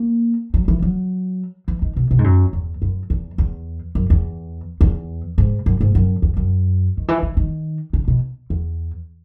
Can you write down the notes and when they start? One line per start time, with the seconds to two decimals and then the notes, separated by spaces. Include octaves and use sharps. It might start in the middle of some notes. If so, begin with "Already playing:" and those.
Already playing: A#3
0.54 F#3
0.68 E3
0.82 F#3
1.68 E3
1.82 D#3
1.96 B2
2.11 B2
2.19 G#2
2.24 F#2
2.53 E2
2.82 F#2
3.10 E2
3.38 E2
3.95 F#2
4.10 E2
4.81 E2
5.38 G#2
5.66 F#2
5.81 G#2
5.95 F#2
6.22 E2
6.37 F#2
6.97 D#3
7.08 E3
7.23 D#3
7.37 D#3
7.93 C#3
8.08 B2
8.50 E2